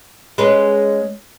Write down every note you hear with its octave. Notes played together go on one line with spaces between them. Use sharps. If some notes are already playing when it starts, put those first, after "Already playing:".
G#3 C#4 B4